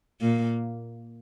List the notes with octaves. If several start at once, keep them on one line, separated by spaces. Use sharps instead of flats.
A#2 A#3